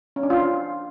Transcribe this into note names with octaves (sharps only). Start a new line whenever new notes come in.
C#4
D4
F4